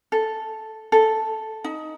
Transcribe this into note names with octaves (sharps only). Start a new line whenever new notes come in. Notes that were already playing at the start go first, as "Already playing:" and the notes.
A4
A4
D#4